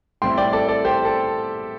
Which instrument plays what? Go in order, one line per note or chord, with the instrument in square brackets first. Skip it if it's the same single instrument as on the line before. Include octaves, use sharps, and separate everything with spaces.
[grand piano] A2 G3 C4 E4 G5 C6
D5 G5
A4 D5
A4 D5
G4 C5
A4